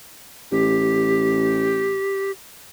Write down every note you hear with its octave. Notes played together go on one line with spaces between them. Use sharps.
A1 G4